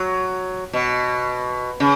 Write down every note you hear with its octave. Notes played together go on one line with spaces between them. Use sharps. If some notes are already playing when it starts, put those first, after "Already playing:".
Already playing: F#3
B2
C#3